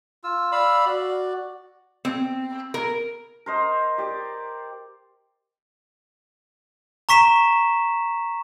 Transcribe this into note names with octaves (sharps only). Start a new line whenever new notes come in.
F4 E6
D5 F5 B5 E6
F#4 D5
C4
A#4
A#4 C5 D#5
G4 D5
A#5 C#6 B6 E7